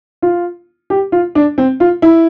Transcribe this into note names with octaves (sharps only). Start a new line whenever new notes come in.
F4
G4
F4
D4
C4
F4
E4